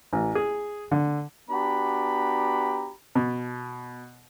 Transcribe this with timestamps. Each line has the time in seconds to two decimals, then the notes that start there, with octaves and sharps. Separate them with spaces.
0.13 A1
0.35 G#4
0.91 D3
1.50 B3 D4 F#4 G4 A#5 B5
3.15 B2